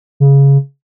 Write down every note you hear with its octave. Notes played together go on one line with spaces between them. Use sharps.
C#3